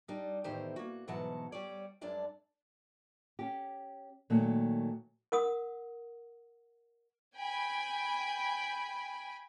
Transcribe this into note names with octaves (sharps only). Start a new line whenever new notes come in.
G3 D4 D#4
E2 A2 D#3 G4 C5 A#5
A#3 F#4
G#2 B2 E3 F#3 F#5 A5
G3 C#5 D5
F#2 G#3 D4 D5 A5
C#4 G4
A#2 D#3 F#3 A3 A#3
A#4 F#5 D#6
G5 G#5 B5